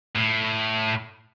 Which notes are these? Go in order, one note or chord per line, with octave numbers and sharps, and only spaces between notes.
A2